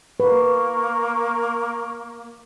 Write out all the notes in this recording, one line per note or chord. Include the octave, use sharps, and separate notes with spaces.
A#3 B4 C#6